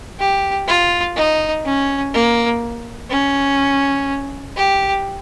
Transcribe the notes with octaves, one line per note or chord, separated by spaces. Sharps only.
G4
F4
D#4
C#4
A#3
C#4
G4